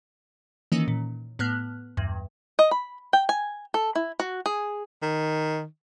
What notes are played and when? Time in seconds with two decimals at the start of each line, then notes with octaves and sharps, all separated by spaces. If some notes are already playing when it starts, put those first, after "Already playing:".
0.72 D#3 E3 A#3 C#4 D#4
0.88 A#2
1.39 A2 B3 F6 F#6
1.97 B1 E2 G2
2.59 D#5
2.71 B5
3.13 G5
3.29 G#5
3.74 A4
3.95 E4
4.20 F#4
4.46 G#4
5.02 D#3